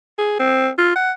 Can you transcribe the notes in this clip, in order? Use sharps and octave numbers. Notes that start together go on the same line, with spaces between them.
G#4
C4
F4
F#5